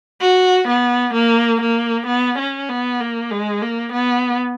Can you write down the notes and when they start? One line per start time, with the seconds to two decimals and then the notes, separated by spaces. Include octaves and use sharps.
0.21 F#4
0.68 B3
1.14 A#3
1.61 A#3
2.07 B3
2.39 C#4
2.69 B3
3.01 A#3
3.31 G#3
3.62 A#3
3.93 B3